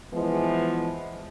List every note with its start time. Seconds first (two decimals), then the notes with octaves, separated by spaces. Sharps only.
0.14 E3 F3 G#3 B3